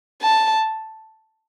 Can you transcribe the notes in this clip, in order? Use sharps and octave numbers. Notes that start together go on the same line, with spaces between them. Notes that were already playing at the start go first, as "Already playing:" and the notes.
A5